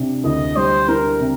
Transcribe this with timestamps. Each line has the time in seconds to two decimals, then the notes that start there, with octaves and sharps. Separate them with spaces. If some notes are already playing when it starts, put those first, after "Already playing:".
Already playing: C3 D4
0.24 D2 D#5
0.56 G3 C5
0.88 D4 A#4
1.20 C3